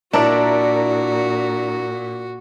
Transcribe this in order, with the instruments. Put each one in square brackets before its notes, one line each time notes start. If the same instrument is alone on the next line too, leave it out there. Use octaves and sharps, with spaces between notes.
[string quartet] A#2 [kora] D4 [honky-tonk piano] E4 A#4 D5 [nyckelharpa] F#4